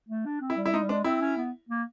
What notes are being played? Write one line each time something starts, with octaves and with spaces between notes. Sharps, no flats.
A3
D4
C4
E4
G3
E4
G#3 D#4
G3
G#3 D4
C4 E4
C#4
B3
A#3